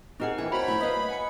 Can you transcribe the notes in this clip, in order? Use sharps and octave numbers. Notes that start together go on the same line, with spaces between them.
C4 D#4 G4 G#4 A#4 F#5
D2 E3 E4 G#5
F#4 C5 C#5 A#5 B5
F#2 A3 E4 E5
B4 D#5 F5 D#6
F#5 G#5 C#7